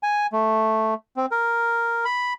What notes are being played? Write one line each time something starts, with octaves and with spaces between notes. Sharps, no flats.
G#5
A3
C4
A#4
B5